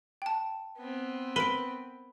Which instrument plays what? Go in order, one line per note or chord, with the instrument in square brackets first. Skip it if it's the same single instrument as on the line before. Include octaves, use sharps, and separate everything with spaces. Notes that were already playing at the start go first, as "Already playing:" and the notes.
[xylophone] G5 A5
[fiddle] B3 C4
[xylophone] A#4 D7 [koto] B4